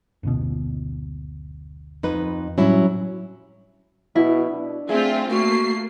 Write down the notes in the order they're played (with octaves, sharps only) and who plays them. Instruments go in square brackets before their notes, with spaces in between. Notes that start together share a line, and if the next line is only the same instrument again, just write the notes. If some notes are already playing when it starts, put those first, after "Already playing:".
[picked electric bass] F#1 D2 B2
[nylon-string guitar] F2 D#4 B4
[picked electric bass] A2 G3 D4 [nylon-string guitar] F#3 C#4 E4
[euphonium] B2 [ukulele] E4
[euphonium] D4
[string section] A3 C4 F4 [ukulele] G#4 [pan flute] E5
[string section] A3 A#3 C7 [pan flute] F#4